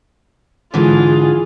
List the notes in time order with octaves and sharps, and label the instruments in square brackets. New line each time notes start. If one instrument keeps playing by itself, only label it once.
[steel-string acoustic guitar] G#2 D3 E3 [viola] F4 G#4